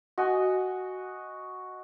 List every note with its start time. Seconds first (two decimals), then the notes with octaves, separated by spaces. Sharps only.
0.18 F#4 D#5 G#5